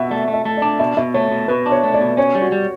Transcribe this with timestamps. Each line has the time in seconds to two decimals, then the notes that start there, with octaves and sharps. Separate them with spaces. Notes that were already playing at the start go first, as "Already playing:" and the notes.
Already playing: B2 E5 F#5
0.10 A3 D5
0.28 A3
0.34 E5
0.45 A3
0.57 D4 D5
0.79 B2 E5
0.97 B2 E5
1.14 A3 C#5
1.32 B2
1.48 B2 B4
1.66 D4
1.72 C#5
1.83 A3
1.94 D5
2.01 B2
2.17 C#4 C#5
2.35 G3
2.41 F#4
2.52 G3